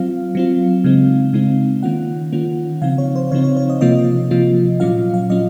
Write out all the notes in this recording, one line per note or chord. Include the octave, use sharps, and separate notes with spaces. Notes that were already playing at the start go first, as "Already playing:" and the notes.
Already playing: F#3 C4 F4 F5
F#3 C4 F4
C#3 G#3 C4 D#4
C#3 G#3 C4 D#4
D#3 A#3 C#4 F4 F#5
D#3 A#3 C#4 F4
C#3 F3 C4 D#4 F5
C#5
C5
C#3 F3 C4 D#4 C#5
C#5
C#5
D#5
C3 F3 A#3 F4 D#5
C3 F3 A#3 F4
A#2 F#3 C#4 F4 F5
F5
A#2 F#3 C#4 F4 D#5